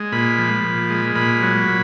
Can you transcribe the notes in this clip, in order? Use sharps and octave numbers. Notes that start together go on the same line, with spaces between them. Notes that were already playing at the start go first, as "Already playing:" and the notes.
Already playing: G#3
A#2 B5
F3
A#2
G#3
A#2 B5
F#3
A#2